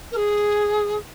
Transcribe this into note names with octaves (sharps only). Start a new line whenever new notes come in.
A#4
G#4